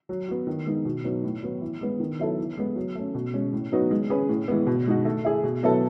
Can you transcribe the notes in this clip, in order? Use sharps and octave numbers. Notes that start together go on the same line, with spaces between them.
F#3
B3 F#4
D#3
G#3 B3 D#4
B2
F#3 B3 D#4
A2
F#3 B3
E3
G#3 B3
D#3
F#3 B3 E4 A4
E3
G#3 B3
F#3
A3 C#4
B2
G#3 C#4
A2
F#3 B3 D#4 F#4
G#3
C#4 G#4 B4
A2
E3 G#3 B3
B2
G#3 D#4 F#4
A3
E4 G#4
B2
F#3 B3 E4 A4